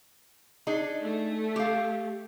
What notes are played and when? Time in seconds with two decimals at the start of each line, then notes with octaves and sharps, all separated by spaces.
0.67 D4 D#4 G#4
1.02 A3
1.56 G4 F5